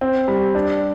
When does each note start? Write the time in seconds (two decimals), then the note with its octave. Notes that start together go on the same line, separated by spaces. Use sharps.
0.01 C4
0.28 G3
0.55 D4